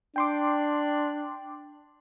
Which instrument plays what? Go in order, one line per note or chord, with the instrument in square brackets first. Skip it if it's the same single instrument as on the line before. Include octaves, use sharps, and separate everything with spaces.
[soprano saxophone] D4 [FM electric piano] G5 C6 D6